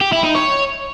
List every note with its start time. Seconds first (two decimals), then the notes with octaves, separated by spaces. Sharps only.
0.01 G4
0.12 E4
0.24 D#4
0.35 C#5